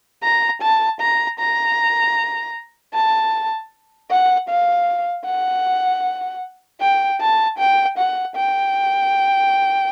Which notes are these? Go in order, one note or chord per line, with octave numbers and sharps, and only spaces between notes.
A#5
A5
A#5
A#5
A5
F#5
F5
F#5
G5
A5
G5
F#5
G5